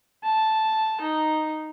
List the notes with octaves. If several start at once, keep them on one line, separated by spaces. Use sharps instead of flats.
A5
D#4